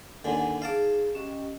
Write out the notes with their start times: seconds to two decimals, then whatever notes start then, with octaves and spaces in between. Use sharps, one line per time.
0.24 D#2 D3 A4 F#5 G#5
0.62 D#4 G#4 F5 A5 D6
1.15 C#4 G4 D#5